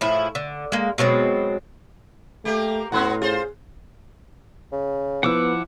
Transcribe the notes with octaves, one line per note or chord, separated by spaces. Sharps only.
A2 F3 E4 G#4
D3
G#3 A#3
B2 F#3 G#3 C4
A3 A#3 G4
A2 B3 C#4 F#4 F#5 C6 F#6
F4 G#4 C5
C#3
F3 B3 E4 F#5 D6 E6